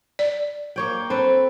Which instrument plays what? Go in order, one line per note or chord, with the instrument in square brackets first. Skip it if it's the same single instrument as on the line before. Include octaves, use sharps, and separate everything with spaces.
[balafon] D5
[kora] A#3 C#5 G5
C4 A4 B4